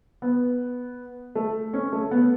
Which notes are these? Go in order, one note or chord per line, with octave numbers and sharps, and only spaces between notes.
B3
A3
C#4
A3
B3